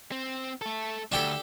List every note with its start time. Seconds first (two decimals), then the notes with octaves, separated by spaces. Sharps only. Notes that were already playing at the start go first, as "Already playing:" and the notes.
0.12 C4
0.62 A3 A4
1.12 D2 D4 G4 A4